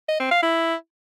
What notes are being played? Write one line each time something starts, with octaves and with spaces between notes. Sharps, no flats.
D#5
C4
F5
E4